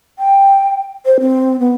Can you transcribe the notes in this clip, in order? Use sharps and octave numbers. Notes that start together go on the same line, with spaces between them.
G5
C5
C4
B3